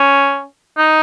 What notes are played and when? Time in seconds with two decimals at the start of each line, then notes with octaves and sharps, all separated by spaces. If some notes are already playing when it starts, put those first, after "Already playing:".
Already playing: C#4
0.77 D#4